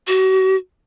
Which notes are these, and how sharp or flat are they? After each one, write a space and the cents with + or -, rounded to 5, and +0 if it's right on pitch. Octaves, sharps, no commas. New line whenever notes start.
F#4 +35